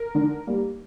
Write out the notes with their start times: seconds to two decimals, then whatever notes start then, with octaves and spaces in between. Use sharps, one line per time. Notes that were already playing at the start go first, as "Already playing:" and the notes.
Already playing: A#4
0.15 D3
0.47 G3 A#3